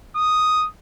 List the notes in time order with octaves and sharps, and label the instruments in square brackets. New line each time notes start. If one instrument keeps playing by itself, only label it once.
[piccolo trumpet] D#6